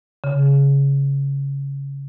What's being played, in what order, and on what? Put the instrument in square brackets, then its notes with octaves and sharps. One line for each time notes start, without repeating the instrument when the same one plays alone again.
[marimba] C#3